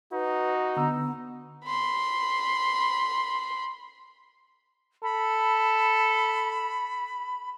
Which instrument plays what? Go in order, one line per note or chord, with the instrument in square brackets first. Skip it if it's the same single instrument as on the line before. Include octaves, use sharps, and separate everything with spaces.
[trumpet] D#4 [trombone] F#4 [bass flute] B4
[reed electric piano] D3 A#5 E6 [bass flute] B3
[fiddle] B5 C6
[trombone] A4 [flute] B5